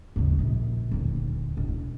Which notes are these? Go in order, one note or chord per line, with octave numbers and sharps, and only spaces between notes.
D#2 C#3
A#1
D#1 D2
E1